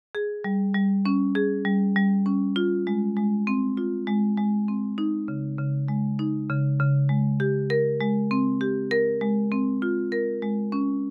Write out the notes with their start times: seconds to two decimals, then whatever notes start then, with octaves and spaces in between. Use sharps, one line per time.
0.15 G#4
0.44 G3
0.75 G3
1.06 C#4
1.35 G#4
1.65 G3
1.96 G3
2.26 C#4
2.56 F4
2.87 G#3
3.17 G#3
3.47 C4
3.77 F4
4.07 G#3
4.37 G#3
4.68 C4
4.98 D#4
5.28 C#3
5.59 C#3
5.88 G#3
6.19 D#4
6.50 C#3
6.80 C#3
7.09 G#3
7.40 G4
7.70 A#4
8.00 G#3
8.31 C4
8.61 G4
8.91 A#4
9.21 G#3
9.52 C4
9.82 F4
10.12 A#4
10.42 G#3
10.72 C#4